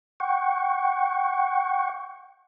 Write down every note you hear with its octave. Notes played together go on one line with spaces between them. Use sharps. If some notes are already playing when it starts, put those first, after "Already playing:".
F#5 G5 C#6